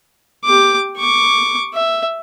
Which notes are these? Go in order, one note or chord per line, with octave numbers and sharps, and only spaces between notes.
G4 D6
C#6 D6
E5